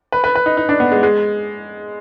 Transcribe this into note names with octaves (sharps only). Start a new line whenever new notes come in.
B4
B4
B4
D#4
D#4
D4
B3
G#3
G#3